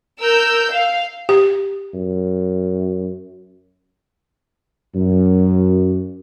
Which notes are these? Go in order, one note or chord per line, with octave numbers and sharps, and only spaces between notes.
A#4 E6 G6
F5
G4
F#2
F#2